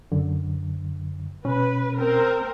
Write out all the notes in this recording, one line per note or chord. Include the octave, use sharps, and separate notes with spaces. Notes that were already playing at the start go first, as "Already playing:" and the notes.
F#2 D3
B2 C#4 B4
C4 A#4